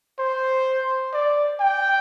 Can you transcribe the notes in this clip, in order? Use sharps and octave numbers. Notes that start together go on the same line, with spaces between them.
C5
D5
G5